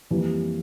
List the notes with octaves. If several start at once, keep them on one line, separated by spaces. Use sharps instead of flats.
F2 E3 G3 A#3